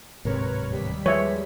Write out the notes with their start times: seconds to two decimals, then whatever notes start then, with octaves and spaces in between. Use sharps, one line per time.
0.25 D1 G#2 C3 A#4 B4 C#5
0.70 D#2 G3 B6
1.06 F3 G#3 B4 C#5 E5